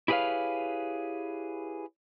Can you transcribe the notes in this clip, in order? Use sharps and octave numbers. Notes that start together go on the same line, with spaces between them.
E4 G4 G#4 B4 C#5 F5